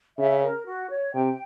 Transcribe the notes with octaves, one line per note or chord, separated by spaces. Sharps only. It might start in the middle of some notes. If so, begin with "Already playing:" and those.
C#3 E5
A#4
F#4
C#5
C3 G5